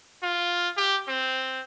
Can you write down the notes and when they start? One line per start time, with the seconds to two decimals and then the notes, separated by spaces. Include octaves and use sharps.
0.23 F4
0.77 G4
1.08 C4